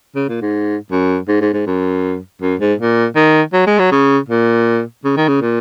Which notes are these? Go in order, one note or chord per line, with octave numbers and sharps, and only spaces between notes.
C#3
A#2
G#2
F#2
G#2
G#2
G#2
F#2
F#2
G#2
A#2
D#3
F#3
G#3
F#3
C#3
A#2
C#3
D#3
C#3
A#2